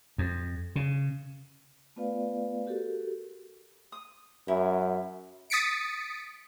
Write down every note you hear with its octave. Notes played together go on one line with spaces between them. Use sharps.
F2
C#3
A3 B3 F4 B4 D5 F5
F#4 G4 A4 A#4
D#6
F#2 E4
D#6 A6 B6 C#7 D7